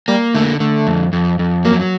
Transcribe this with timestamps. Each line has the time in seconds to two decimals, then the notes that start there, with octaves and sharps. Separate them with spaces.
0.08 G3 A#3
0.34 D3 A3
0.60 D3 A3
0.87 F2
1.13 F2
1.39 F2
1.65 F#3 A#3